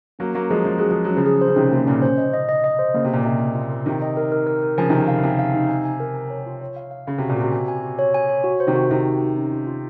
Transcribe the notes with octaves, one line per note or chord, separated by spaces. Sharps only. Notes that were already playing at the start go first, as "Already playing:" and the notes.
F#3 A#3 C#4
F#3 A#3 C#4
F3 G#3 G#4
F3 C#4
F#3 G#4
F3
G#4
F#3
C#4
C#3 F3
G#4
C5
C#3
C3 D#3 C#4
C3 A#3
A#2 C#3 C#4
C5
D#5
D#5
D#5
D#5
C5
C#3 A#3
C3
A#2 A#3
C3 D#5
F4
F4
A#4
C3 D#3 D#4
D#5
A#4
A#4
A#4
A#4
C#3 F3 G#5
C3 D#3 A#4
C3
F5
C#3
C3 G#5
F5
D#4
G#5
G#5
A#4
G#5
C#5
F4
C#5
F5
F5
C#3 F5
C3 F#4
A#2
C3 F#4
G#5
G#5
F#4
C#5
G#5
C#5
F#4
C5
C3 D#3
F#4
C3 D#3 F#4
D#4
D#4
C#4
F4
F4